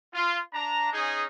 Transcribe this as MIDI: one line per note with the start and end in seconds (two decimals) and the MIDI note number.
0.14 0.38 65
0.54 0.92 62
0.54 0.92 82
0.93 1.25 61
0.93 1.25 63
0.93 1.25 68